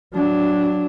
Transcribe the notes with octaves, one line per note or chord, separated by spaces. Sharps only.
F#3 D4